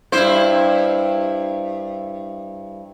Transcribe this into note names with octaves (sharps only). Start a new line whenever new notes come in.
G2 E4 C5